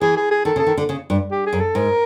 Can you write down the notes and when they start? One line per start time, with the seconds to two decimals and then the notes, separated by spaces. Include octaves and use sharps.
0.01 E3 G#4
0.17 G#4
0.31 G#4
0.45 D#3 A4
0.56 C#3
0.59 A4
0.67 D#3
0.77 D3
0.89 C#3
1.10 G2
1.31 G4
1.46 G#4
1.53 F#2
1.60 A4
1.75 G#2 A#4